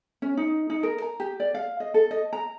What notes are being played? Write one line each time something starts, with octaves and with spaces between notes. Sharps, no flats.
C#4
D#4
D#4
A#4
A#5
G4
D5
F5
D#5
A4
D#5
A#5